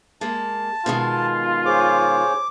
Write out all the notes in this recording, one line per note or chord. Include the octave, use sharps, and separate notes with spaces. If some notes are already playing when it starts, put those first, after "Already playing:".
G#3 A#3 A5
B2 D#3 G#3 F4
G#4 C5 C#5 D6